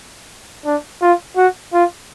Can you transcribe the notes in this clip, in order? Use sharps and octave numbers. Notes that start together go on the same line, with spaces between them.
D4
F4
F#4
F4